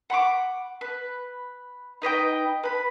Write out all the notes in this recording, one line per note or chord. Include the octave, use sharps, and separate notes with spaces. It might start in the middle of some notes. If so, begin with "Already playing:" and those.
F#5 B5 C#6 D6
B4
D#4 B4 D#5 G5
B4 B5